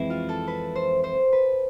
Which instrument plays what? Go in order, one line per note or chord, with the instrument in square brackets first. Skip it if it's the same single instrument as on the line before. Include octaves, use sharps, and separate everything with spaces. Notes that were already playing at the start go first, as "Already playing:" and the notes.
Already playing: [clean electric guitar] F2 E3 G#3 C4 E4 [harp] B4
[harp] F4
A4
B4
C5
C5
B4